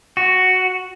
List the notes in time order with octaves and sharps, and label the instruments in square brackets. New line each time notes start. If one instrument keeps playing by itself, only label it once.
[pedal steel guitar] F#4